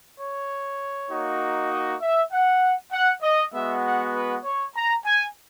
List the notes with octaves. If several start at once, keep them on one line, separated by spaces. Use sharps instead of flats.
C#5
A#3 D#4 F#4
D#5
E5
F#5
F#5
D#5
G#3 B3 F#4 E5
F#5
B4
C#5
A#5
G#5